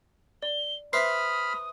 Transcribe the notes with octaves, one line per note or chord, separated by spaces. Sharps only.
D5 G7
B4 C5 E5 B5 D#6 F6 B6 C7